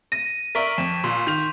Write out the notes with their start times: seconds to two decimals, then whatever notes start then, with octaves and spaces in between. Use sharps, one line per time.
0.12 A#6 D#7
0.55 A#4 D5 E5 C#6 B6 D7
0.78 F2 E7
1.04 A#2 C6
1.27 D#3 G6 F7